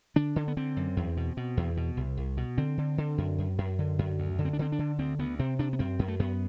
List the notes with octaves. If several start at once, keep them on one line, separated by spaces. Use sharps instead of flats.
D3 D4
D3
B3
D3 C4
F#2
E2
B2
B2
E2
B2
C2
C2
B2
D3 C4
D3
D3
F#2
F#2
F#2
D3
F#2
D2
D3
C4
D4
D3 C4
D4
D3
D2 C4
D2 B3
C3 C4
C3 D4
B3
F#2 C4
F#2
A3
F#2 B3